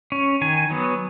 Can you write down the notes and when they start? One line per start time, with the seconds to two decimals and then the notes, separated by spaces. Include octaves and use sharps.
0.12 C#4
0.41 D#3 G#5
0.70 F#3 B3